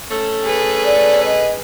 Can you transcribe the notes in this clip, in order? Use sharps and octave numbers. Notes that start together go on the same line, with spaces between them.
A3 C#4 A4
G#4 B4
D5
D#5